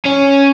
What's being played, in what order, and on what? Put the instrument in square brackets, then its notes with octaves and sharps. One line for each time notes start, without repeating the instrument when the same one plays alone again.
[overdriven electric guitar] C#4